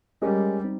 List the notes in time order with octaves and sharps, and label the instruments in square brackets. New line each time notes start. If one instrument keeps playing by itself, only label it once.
[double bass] G3 [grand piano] G#3 C#4 G4 A#4 D#5
[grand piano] C4 D#4